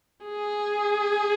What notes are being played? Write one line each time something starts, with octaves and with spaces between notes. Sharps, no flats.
G#4